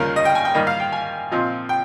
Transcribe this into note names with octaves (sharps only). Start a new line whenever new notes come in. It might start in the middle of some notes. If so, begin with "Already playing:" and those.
Already playing: D#2 C#3 G3 C#4 F4 A#4
D#5
G5
G#5
G5
G#2 D#3 G3 A#3 D#5
F5
G5
G#5
A#2 F3 C4 D#4
G5